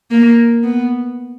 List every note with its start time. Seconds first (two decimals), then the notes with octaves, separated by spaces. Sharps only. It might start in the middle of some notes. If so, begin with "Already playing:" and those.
0.11 A#3
0.63 B3